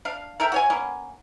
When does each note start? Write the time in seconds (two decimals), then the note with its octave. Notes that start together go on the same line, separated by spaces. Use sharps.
0.05 D4 F5
0.40 A4 A#4 E5 G5
0.52 F#4 C#5 G#5
0.70 A#3 B3 C#4